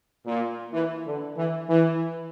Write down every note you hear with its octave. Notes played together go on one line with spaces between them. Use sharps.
A#2
E3
D3
E3
E3